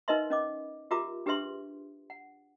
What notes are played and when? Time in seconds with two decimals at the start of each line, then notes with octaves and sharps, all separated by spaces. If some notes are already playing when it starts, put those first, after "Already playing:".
0.08 D#4 A#4 B4 D#5 E5 C6
0.30 C#4 D#5 D6
0.91 F4 G4 A#4 E5 A#5 D6
1.26 D4 G4 G#4 B4 E5 C6
2.10 F#5